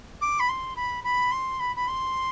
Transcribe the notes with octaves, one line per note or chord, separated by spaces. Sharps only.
D6
B5
C6
B5
B5
C6
B5
B5
C6